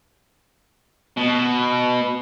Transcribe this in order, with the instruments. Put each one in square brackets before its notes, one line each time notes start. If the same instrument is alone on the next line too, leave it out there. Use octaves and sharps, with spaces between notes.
[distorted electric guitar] B2